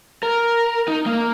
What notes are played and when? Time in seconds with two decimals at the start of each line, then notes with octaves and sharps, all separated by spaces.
0.23 A#4
0.88 D#4
1.06 A#3